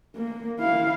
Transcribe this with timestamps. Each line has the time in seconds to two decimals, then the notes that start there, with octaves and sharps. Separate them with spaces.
0.16 A#3
0.60 E4 F5